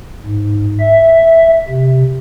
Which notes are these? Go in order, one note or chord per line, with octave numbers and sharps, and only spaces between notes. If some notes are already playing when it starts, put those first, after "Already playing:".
G#2
E5
C3